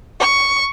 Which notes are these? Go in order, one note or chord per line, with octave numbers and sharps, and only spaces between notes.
C#6